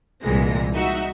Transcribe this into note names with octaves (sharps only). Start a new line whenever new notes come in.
C2 A#2 E3 G#3 A#6
D#4 F#4 E5